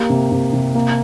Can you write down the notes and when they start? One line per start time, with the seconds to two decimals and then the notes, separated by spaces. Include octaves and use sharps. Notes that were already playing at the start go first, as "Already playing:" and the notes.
Already playing: A#3 G4
0.10 C3
0.32 C3
0.53 C3
0.75 A#3